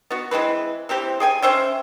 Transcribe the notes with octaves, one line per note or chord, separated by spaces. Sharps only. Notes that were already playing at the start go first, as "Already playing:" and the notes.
B3 F#4
E3 G#3 C4 B4
E3 C4 G4 C5
G#4 G5 G#5
C#4 C5 E5 G5